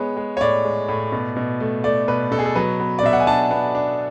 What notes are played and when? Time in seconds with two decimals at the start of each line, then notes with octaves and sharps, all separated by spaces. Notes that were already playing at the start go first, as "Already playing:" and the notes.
Already playing: G#3 B3 C#5
0.17 G#3
0.37 C#5
0.41 A2 D5
0.64 G#3
0.88 A2
1.12 B2
1.36 B2
1.60 A3
1.84 A3 D5
2.08 B2 B4
2.31 B2 A4
2.39 G#4
2.46 A4
2.55 F#3 B4
2.80 B3
2.99 D5
3.03 B2 E5
3.13 F#5
3.20 G#5
3.27 D4 A5
3.51 B3
3.75 D4